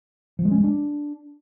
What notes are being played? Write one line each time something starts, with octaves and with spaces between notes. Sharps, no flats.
F3
G#3
C#4
G#3
D4